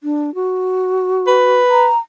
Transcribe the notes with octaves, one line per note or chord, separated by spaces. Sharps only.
D4
F#4
B4
A#5